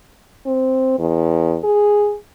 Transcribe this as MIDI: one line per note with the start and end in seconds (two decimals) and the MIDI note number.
0.46 0.96 60
0.99 1.58 40
1.64 2.15 68